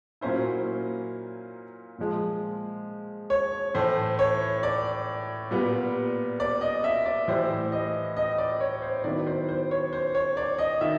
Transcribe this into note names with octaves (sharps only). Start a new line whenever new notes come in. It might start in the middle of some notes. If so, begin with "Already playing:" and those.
A#2 F#3 A#3 C#4 E4 C5
A#2 F3 G#3
C#5
A2 E3 A3 C5
C#5
D5
A#2 G3 B3
D5
D#5
E5
D5
A2 E3 G3 C5
D#5
D#5
D5
C#5
C5
D#3 F#3 B3 E4 D5
C5
C5
C#5
C5
C#5
D5
D#5
D#3 E5